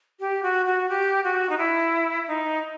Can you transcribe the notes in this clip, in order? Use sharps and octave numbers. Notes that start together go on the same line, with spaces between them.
G4
F#4
F#4
G4
F#4
D#4
E4
D#4